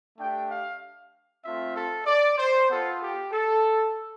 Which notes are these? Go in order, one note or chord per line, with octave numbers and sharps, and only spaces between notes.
A3 D4 G4 G5
F5
A3 C4 F4 E5
A4
D5
C5
B3 F4 A4
G4
A4